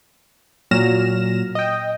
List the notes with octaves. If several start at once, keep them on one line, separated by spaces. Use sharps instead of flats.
A#2 F#3 F6 A#6 E7
D#5 G5